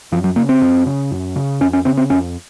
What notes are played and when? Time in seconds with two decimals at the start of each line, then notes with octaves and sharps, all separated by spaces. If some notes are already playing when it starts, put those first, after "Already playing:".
0.12 F#2 F3
0.24 F#3
0.36 C#3 A#3
0.49 C4
0.62 F#2
0.86 C#3
1.11 F#2
1.36 C#3
1.60 F2 C#4
1.73 C#4
1.85 C#3 C4
1.97 C4
2.10 F2 C#4